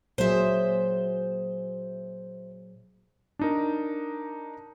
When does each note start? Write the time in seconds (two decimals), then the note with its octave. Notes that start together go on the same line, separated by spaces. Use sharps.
0.18 A#2 F#3 G#4 C5 E5
3.39 D4 D#4 A#4